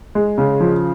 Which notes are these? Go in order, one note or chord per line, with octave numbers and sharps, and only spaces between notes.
G#3
C#3
F3